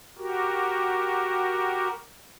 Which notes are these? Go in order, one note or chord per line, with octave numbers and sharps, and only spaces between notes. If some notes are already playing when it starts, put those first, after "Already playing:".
F#4 G4 A#4